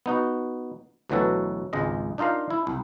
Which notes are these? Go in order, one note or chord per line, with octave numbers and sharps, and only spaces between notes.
B3 D#4 F#4
D2 B2 E3 F#3 F#4 A4
G#1 C#2 G#3 D#5
D4 D#4 F4 A#4 F5
E4
C2